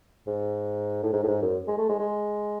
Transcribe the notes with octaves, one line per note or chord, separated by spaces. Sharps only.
G#2
A2
G#2
A2
G#2
F#2
G#3
A3
G#3
G#3